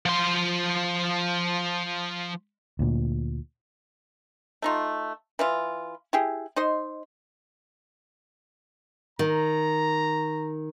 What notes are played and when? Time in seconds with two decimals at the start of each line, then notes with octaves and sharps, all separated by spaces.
0.05 F3 C6
2.79 D2 A#2
4.62 A3 D#4 F4
5.39 E3 E4 F4
6.13 E4 G4 G#4
6.56 D#4 C5 D#5 C6
9.19 D#3 A#5